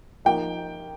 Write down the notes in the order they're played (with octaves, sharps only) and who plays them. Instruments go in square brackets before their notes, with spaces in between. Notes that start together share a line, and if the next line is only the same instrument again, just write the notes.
[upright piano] F3 A#3 D#4 G5